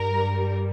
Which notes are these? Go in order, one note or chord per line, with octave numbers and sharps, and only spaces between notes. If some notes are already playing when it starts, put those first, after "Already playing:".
Already playing: G2 G3 A#4